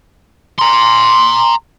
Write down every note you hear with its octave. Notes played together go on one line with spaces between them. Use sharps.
A#5 C6